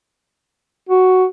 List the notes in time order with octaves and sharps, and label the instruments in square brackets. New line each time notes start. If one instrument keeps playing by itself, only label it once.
[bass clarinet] F#4